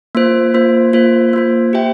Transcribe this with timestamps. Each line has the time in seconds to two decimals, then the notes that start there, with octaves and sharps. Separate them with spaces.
0.15 A#3 F4 C5
0.54 A#3 F4 C5
0.93 A#3 F4 C5
1.33 A#3 F4 C5
1.73 G4 C5 E5 G5